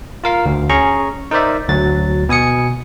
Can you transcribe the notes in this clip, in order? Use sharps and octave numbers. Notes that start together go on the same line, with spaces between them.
F4 A#4 F5
D2
C#4 G#4 A#5 C#6
D#4 A#4 C5 D5 E5
D2 F#3 A6
B2 G#5 D#6 C#7